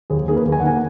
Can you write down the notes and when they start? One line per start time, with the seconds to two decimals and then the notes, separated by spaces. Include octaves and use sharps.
0.10 D#2 G#4
0.28 D#3 A#3 G#4
0.36 B4
0.45 D#2
0.52 G#5
0.60 F#5
0.62 D#3 A#3 G#5